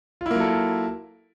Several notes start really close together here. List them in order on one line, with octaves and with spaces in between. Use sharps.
F4 E4 A#3 F#3 A4